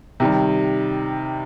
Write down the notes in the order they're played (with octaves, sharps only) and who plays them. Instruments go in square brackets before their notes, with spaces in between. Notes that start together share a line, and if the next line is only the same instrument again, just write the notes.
[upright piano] C3 D#3 G3